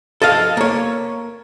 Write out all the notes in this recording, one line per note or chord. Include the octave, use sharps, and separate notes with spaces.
A4 D#5 F5
A#3 C#5